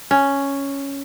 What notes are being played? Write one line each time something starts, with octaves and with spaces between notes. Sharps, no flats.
C#4